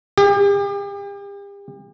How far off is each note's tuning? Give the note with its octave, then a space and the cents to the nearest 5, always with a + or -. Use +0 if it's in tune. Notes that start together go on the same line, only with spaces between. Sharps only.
G4 +40